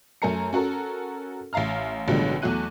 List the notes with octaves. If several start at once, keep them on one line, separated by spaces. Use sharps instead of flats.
F#2 A3 A#4 G#5 A#5 C#7
C#4 F#4 A4 A#4
A1 E5 F5 A#5 F6
A1 B2 D3 F3 G3 G#3
E2 F#3 A3 F#4 F#6 D#7